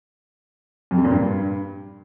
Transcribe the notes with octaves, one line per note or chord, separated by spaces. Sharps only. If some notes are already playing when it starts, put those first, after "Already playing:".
F2
C3
A#2
G2